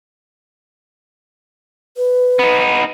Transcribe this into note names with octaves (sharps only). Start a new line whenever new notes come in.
B4
B3 D#4